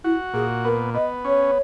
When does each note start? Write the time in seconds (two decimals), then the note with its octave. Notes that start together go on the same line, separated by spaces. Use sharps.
0.04 E4 F#4
0.34 A#2 G#4
0.64 B3 A#4
0.94 B3 D#5
1.25 C#4 C#5